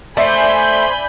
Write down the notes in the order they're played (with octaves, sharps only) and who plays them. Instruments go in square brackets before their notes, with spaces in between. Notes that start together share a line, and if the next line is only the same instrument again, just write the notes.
[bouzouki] A3 [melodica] C5 [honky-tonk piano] D5 E5 C7 [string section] G#5 B5 G6